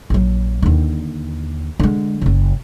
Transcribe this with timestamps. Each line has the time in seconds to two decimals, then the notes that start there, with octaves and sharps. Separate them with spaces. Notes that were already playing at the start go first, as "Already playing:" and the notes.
0.10 A#1 F#3
0.62 D#2 D3
1.80 D3 G#3
2.21 F#1 C#3